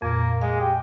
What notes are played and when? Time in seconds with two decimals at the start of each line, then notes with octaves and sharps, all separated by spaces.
0.02 F2 A#2 A#3
0.42 G#3 F5
0.60 G4